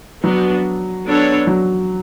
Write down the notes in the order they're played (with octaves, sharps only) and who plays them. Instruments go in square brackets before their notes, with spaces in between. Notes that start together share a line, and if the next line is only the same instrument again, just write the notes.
[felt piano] F#3 [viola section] B3 D4 F#4
[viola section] B3 D4 A4 C#5
[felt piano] F#3